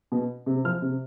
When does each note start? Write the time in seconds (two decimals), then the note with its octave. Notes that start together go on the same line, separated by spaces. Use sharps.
0.12 B2
0.46 C3
0.64 F3 F6
0.82 C3